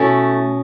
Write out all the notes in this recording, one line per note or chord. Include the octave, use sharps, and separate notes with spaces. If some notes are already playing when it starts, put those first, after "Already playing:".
Already playing: B2 A3 C#4 E4 A5